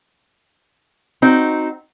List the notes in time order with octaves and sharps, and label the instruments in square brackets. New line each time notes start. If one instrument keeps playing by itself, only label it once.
[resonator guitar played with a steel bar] C4 D#4 F#4